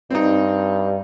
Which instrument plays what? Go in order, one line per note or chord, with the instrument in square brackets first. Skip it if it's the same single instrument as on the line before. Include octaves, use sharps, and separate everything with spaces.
[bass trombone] G2 [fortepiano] C4 D#4